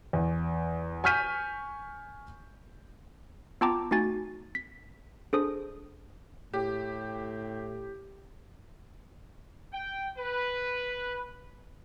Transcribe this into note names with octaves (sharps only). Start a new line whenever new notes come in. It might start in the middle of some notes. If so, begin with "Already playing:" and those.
E2
G#5 C#6 F6 G6 B6 D#7
B3 F4 G5 A5 A#5 D6
A3 D#4 F#4 G#5 A6
B6
D4 G#4 A4 C5 D#6
A2 G4
G5
B4